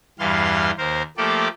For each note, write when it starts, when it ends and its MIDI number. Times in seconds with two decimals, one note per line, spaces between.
0.19 0.71 40
0.19 0.71 43
0.19 0.71 52
0.19 0.71 55
0.19 0.71 77
0.19 0.71 84
0.78 1.02 39
0.78 1.02 70
0.78 1.02 72
1.17 1.48 53
1.17 1.48 57
1.17 1.48 58
1.17 1.48 67
1.17 1.48 69
1.17 1.48 74